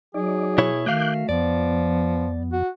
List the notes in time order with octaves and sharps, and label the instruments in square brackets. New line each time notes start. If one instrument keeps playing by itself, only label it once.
[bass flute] F#3 [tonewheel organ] D#4 D5 [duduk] G#4
[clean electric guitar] B2 E4 C#5
[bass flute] D#3 [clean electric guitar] A3 F#4 F5 [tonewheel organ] D6 F#6 G6
[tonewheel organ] F2 [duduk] F3 [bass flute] B3 [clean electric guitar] D5
[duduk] F#4